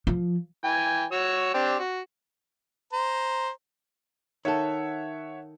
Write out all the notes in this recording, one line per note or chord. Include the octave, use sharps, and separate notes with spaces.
F3
E3 G5 G#5
F#4 C#5 E6
C4 D4 G4
F#4
C5 A#5
D#3 A4 C#5 E5 F#5